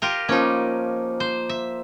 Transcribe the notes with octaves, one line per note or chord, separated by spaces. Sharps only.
F4 G4 A#4
F3 A#3 C#4 D#4
C5
E5